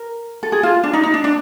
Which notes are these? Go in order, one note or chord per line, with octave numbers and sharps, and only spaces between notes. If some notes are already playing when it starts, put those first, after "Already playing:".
Already playing: A#4
A4
G#4
F4
D4
D#4
D#4
D4
D4